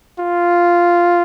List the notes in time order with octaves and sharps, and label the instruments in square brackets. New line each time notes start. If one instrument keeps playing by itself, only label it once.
[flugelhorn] F4